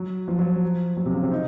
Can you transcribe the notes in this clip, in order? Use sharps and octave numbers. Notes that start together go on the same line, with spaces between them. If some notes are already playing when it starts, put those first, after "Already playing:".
Already playing: F#3
F3
F#3
F3
F#3
C3
C#3
C4
D#4